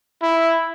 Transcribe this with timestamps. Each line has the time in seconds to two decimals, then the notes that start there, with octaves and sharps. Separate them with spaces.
0.22 E4